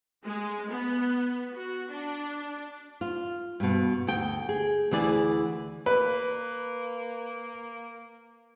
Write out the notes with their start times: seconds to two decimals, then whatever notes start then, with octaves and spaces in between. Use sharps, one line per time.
0.24 G#3
0.70 B3
1.52 F#4
1.92 D4
3.01 F4
3.60 G2 B2
4.07 D2 G5
4.49 G#4
4.91 D2 E3 G#4 D5
5.86 A#3 B4